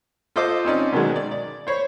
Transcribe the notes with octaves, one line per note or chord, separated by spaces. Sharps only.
F4 A4 C5 D#5 D6
C4 C#4 D#4 D5
B2 D#3 F#3 G#3
D5
D5
C5 C#5 B5